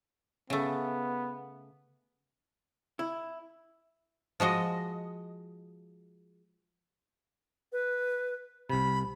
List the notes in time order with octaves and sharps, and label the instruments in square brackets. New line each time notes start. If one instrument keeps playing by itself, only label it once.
[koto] C#3 A3 [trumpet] B3
[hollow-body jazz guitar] E4
[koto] F3 G#3 F#4 D#5
[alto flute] B4
[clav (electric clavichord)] C2 C3 [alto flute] B5